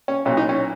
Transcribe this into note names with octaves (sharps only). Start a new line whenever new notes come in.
C#4
B1 A#2 F#3 C#4
D#4
C#4